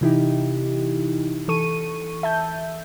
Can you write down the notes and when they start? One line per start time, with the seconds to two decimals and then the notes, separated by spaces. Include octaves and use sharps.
0.01 C3 E3 D#4 E4 G4
1.48 E3 A4 C#6 D#7
2.23 E5 A5 G6